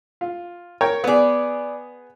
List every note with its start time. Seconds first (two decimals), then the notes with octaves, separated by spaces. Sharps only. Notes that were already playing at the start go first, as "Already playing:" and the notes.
0.21 F4
0.81 A#4 C#5 G5
1.04 B3 G#4 B4 D5